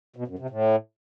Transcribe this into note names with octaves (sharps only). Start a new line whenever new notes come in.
B2
F#2
C3
A2